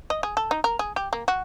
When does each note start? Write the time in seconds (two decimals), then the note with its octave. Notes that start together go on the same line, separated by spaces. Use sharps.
0.10 D#5
0.23 G#4
0.37 A4
0.51 D#4
0.64 A#4
0.79 G#4
0.96 G4
1.13 A#3
1.28 F#4